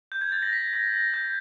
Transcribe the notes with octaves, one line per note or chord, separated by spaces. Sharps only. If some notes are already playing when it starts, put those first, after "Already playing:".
G6
G#6
A6
A#6
B6
A#6
A#6
G6